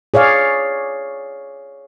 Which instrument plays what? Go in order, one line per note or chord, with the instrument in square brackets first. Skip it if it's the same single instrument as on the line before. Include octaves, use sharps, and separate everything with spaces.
[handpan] G#4 C#5 D5 F5